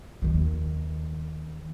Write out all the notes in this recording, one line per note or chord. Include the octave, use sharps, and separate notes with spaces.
D#2 D#3